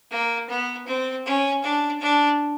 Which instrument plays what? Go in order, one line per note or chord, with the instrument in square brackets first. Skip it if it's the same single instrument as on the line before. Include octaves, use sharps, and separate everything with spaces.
[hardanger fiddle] A#3
B3
C4
C#4
D4
D4